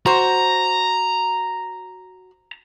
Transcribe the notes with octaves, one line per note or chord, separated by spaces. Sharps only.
F#4 C5 A#5